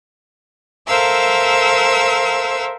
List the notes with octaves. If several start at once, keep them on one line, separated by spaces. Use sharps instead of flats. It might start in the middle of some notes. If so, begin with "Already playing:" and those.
A4 A#4 C5 E5 F5 E6